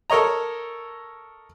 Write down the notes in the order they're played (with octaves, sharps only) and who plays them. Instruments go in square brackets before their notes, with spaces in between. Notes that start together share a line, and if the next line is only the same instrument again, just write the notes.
[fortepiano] A4 A#4 C#5 D#5 A#5